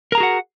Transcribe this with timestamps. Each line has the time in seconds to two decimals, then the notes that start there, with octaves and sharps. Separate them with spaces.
0.12 A#4
0.15 A#5
0.18 G#4
0.20 F#4
0.23 F#5